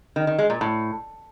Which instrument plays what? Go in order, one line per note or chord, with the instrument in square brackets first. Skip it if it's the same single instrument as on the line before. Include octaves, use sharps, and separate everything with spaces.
[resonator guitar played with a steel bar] D#3
D#3
G#3
A#2
A2